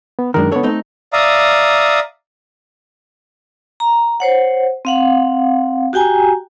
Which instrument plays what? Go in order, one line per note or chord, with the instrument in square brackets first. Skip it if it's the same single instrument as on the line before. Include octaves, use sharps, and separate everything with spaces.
[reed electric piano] B3
[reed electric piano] F#2 A#4 [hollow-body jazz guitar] D#3 G#3 D4
[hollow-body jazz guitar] C#2 D3 C#5 [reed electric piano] B3 A4
[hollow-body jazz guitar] A3 C4 D#4
[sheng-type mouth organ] D5 E5 F5 A#5 D#6
[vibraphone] A#5
C5 C#5 F#5
C4 F5 F#5
F#4 G4 G5 G#5 A#5